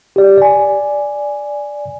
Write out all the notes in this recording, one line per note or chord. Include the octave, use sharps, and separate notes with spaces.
G4 D5
D5 G#5